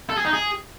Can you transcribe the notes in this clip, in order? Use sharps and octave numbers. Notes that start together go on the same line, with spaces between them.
A4
G#4
D#4
G#4